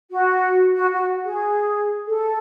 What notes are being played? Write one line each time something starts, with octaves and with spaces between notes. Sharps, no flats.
F#4
F#4
F#4
G#4
A4